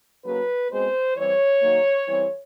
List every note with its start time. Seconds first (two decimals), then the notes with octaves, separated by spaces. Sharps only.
0.24 C#3 F#3 A#3 B4
0.70 B2 G#3 C4 C5
1.16 E3 G3 C4 C#5
1.62 D#3 F#3 A#3
2.08 E3 G3 C4